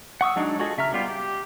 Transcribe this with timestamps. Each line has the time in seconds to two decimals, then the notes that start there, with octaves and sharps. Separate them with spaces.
0.21 F#5 C#6 D#6 E6
0.36 F#3 G#3 D4 D#4 F#4
0.59 F4 F#4 G#4 A4 D#5
0.78 C#3 E5 A#5 F6
0.92 G3 B3 F4 G4
1.08 G4